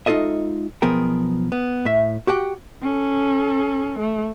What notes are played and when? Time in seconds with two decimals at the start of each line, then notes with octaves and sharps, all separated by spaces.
0.06 G#3 D#4 F4 A4 D#5 E5
0.82 B1 F3 B3 G#4 A#4 G5
1.52 B3
1.85 A2 E5
2.27 F#4 G4 F#5 G5
2.82 C#4 A4
3.99 A3